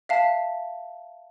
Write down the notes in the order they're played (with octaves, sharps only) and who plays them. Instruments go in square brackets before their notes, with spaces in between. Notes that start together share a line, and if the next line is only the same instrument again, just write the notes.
[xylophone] E5 F5 A5